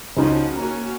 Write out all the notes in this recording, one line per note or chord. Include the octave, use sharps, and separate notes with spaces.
C#2 F3 C#4 D#4 F#4
A#3 C#4 F#4 A#5